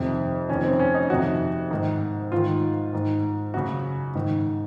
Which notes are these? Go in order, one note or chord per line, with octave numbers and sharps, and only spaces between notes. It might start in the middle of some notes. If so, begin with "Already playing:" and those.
Already playing: F2 C3 D#3
F2 C3 D#3 C#4
C4
C#4
D#4
F2 C3 D#3 F#4
G#2 D#3
G#2 D#3 F4
G#2 D#3
F#2 C#3 F#4
G#2 D#3